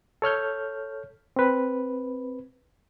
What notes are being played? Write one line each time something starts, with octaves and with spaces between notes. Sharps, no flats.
A4 C#5 F6 G6
C4 B4